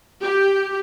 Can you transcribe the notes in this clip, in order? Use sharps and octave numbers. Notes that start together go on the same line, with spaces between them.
G4